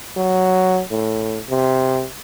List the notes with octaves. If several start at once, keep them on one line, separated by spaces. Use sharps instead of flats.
F#3
A2
C3